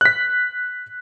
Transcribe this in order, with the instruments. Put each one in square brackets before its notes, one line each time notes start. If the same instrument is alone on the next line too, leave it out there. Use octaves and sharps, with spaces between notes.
[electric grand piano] F#6 B6